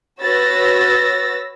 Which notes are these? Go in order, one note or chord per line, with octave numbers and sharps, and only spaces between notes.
F#4 B4 C#5 E6 A6 A#6